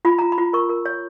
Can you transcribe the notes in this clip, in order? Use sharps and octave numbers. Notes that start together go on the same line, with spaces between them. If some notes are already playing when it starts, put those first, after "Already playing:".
F4 B5
F4 A#5
B5
F4
A#4 C#6
A#4
C#5